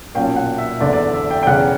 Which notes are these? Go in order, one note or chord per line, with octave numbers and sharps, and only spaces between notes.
B1 A#2 A#3 C#4 G5
F#5
E5
F#1 E2 D3 D5
D5
E5
E5
G5
G5
E1 E2 C#3 F#5